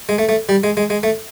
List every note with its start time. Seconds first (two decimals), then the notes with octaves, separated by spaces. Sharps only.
0.09 G#3
0.18 A3
0.29 A3
0.49 G3
0.64 G#3
0.77 G#3
0.90 G#3
1.03 A3